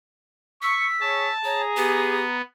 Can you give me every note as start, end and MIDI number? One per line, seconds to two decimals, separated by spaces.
0.62 0.86 85
0.62 1.34 88
0.62 1.32 95
1.00 1.28 68
1.00 1.28 73
1.00 1.61 81
1.44 2.25 68
1.44 1.64 73
1.44 2.37 82
1.76 2.41 59
1.76 2.24 67